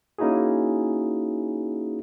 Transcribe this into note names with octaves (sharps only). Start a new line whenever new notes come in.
A#3 C#4 D#4 E4 F#4 G#4